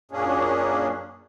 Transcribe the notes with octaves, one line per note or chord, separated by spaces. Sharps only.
F#2 A#2 A#3 C#4 D4 G#4